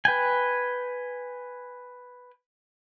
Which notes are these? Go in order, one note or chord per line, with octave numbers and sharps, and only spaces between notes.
B4 G5 G#5